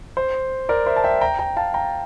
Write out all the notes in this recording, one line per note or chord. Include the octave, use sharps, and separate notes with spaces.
C5
A#4 D5
C5 E5
A5
E5 G5
G5 A#5
G5 A#5
F5 A5
G5 A#5